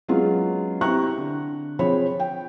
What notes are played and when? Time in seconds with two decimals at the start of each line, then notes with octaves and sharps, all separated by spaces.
0.08 F#3 G#3 B3 C#4 F4 G#4
0.81 C4 E4 G4 A#5 C#6 F#6
1.18 D3
1.79 F3 C4 G#4 C#5 B5
2.20 G5